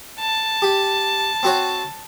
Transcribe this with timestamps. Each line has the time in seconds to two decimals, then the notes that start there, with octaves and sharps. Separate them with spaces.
0.19 A5
0.62 G4
1.43 C4 F#4 C#5